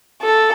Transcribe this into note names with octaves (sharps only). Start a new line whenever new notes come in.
A4